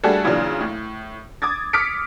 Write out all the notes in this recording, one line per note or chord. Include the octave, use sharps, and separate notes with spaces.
G3 A3 D4 F#4 G#4 A4
A#2 C#3 E3 F#3 D4
A2
D6 D#6 G#6 A6
D6 D#6 F6 B6 C#7 D7